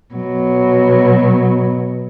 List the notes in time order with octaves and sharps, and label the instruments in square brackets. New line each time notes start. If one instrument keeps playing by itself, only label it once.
[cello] B2 F#3